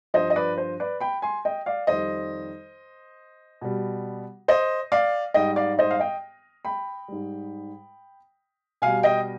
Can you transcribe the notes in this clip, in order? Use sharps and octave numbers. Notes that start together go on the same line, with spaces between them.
G2 F3 C5 D#5
D#5
B4 D5
C5
B4 D5
G5 B5
G#5 C6
D#5 G5
D5 F5
F2 D#3 G3 C5 D#5
B2 G3
C5 D#5
D5 F5
G#2 G3 D#5 G5
D5 F5
C5 D#5
F5
D#5 G5
G5 B5
G#2 G3
B2 G3 F5 G#5
D#5 G5